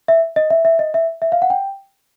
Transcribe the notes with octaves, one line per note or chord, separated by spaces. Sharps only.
E5
D#5
E5
E5
D#5
E5
E5
F5
F#5
G5